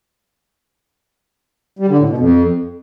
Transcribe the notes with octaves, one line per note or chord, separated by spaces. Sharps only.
G3
D3
A2
B2
F2